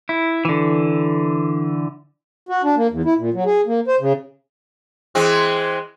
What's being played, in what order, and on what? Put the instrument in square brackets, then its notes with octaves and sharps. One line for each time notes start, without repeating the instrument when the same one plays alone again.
[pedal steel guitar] E4
D3 E3
[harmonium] F#4
D4
A#3
E2
E4
A#2
F#3
G#4
A#3
C5
C#3
[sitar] E3 G#3 C4